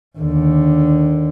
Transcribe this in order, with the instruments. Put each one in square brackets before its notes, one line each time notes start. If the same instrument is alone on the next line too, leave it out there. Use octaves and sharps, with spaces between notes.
[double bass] D#2 D3